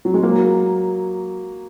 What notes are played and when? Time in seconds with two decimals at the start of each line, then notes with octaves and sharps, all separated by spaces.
0.05 F#3
0.14 G#3
0.23 F#3 A#3